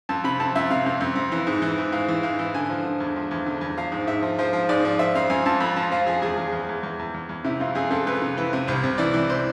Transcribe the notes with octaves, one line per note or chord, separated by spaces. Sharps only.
F2 A5
C3 B5
F2 A5
F2 E5
C3 F5
F2
F2
F2
E3
G#2
E3
G#2
G#2 F5
E3
G#2 F5
E3
D3 G#5
F3
D3
E2
F3
E2
D3
E2
F3 F5
G#2
G#2 E5
F3
F3 C5
F3
G#2 D5
F3
F3 E5
F2 F5
F2 G#5
F2 A5
F2 B5
F3 A5
F3 F5
F3 G#4
E2 G#4
E2
E2
E2
E2
E2
E2
E2
C3 E4
F2 F4
F2 G#4
F2 A4
F2 B4
C3
E3 B4
C3
C2 C5
C2
E3 D5
E3
C5